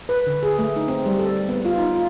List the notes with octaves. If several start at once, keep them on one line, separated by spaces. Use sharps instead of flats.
B4
D3
G#4
A3
D#4
C4
G3
A4
B3
F4
D#4
F4